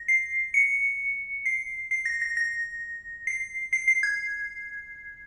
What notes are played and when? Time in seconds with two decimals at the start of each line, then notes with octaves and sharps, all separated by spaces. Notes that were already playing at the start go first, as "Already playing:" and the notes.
Already playing: A#6
0.08 C7
0.54 C#7
1.46 C7
1.91 C7
2.06 A#6
2.22 A#6
2.37 A#6
3.27 C7
3.73 C7
3.88 C7
4.03 G#6